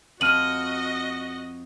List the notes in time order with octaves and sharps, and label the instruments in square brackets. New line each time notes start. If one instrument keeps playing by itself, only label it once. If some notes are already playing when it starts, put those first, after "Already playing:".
[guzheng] F2 [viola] F#4 D#5 [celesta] F6 D#7 F#7